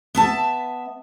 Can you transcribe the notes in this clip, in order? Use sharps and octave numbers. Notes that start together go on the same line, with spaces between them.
B3 E5 A5